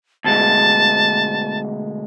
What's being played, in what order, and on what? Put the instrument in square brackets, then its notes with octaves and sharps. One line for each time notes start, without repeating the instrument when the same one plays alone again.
[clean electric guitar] D2 B2 G#3 [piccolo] A5